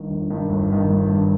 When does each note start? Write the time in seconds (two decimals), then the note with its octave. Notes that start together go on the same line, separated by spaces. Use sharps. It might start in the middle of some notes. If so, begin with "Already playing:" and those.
Already playing: G1 G2 D#3
0.11 G1
0.30 G2 D#3
0.49 G1
0.70 G2 D#3
0.90 G1
1.09 G2 D#3